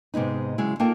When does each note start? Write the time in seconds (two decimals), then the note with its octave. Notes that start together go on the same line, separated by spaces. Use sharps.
0.14 G#2 C3 G#3 B3 D#4
0.58 C#3 F#3 G#3 E4
0.80 A#3 D#4 F4 A4 A#4 G5